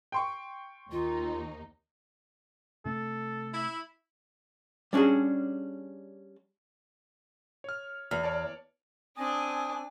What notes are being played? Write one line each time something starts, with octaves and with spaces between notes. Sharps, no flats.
G5 C6 C#6
D#2 D#4 F4
C3 A3 A4
E4
G3 C#4 D4 F#4 G#4
C#5 F6
E2 F6
C#5 D5 A5
C4 D4 G#5 A5 D#6